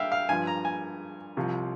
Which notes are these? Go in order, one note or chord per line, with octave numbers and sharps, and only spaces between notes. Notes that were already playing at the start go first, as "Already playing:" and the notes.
Already playing: G2 E5 F5 G5
F5
G2 F3 G#5
A#5
G#5
C2 C3 F3